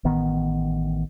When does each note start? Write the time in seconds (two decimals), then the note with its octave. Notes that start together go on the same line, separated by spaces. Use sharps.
0.05 A1 D#3 B3